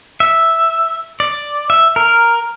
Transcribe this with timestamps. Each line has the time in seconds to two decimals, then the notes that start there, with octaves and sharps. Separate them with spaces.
0.20 E5
1.20 D5
1.70 E5
1.96 A#4